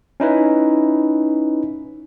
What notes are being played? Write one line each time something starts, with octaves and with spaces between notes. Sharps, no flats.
C#4 D#4 E4 B4